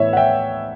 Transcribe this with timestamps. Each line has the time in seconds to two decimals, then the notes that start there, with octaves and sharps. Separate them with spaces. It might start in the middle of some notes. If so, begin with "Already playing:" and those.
Already playing: A2 E3 B3 C#5 E5
0.13 F#5
0.17 E5 G5